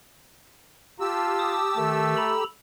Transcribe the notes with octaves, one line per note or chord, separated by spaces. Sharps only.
F4 G4 A5 E6
D6 D#6
D#3 A3
A4 A#5 B5